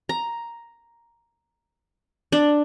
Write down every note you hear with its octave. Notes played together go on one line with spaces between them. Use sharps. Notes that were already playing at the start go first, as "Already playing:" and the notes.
A#5
D4